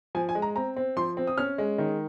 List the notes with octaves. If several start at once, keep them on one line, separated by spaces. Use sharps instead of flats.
F3 G#5
G#5
G#3
A#5
C4 A#5
C4
F3 C6
C4
D#6
C#4 F6
G#3
D#3